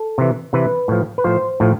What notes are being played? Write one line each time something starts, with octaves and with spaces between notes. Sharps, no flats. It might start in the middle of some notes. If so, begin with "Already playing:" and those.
Already playing: A4
C3 E3
C3 E3 B4
A2 F3
B4
A2 F3 C5
A2 F3